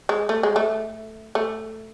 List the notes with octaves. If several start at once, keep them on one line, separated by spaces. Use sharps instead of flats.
G#3
A3
G#3
A3
A3